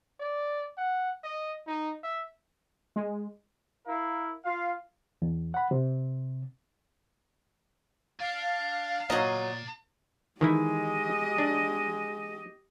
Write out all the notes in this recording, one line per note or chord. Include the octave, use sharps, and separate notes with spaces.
D5
F#5
D#5
D#4
E5
G#3
E4 A#4 F5
F4 F5
E2
F#5 B5
C3
D4 F5
A#2 F#3 D5 D#5 A#5
D#3 E3 G#3 E4 G4 D#5
D4